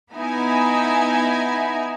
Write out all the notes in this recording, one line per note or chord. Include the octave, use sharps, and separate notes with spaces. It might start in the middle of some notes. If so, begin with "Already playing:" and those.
B3 D#4 E4 G#5